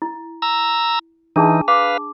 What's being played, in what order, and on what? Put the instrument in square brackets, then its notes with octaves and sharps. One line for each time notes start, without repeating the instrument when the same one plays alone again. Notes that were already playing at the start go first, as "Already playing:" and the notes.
[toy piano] E4
[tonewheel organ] A#5 E6
[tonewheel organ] E3 D#4 [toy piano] D4 G#4 A5
[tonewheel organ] B4 F5 [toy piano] D6